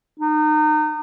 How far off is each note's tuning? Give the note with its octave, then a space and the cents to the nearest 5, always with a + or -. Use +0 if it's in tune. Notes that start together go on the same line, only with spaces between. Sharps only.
D#4 -30